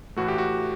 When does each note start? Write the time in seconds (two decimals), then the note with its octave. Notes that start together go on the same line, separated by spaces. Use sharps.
0.16 A2 E3 A3 F#4
0.28 G4
0.38 F#4